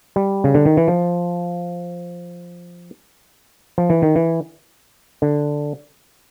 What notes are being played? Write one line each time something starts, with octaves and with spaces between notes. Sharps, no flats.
G3
C#3
D3
D#3
E3
F3
F3
E3
D#3
E3
D3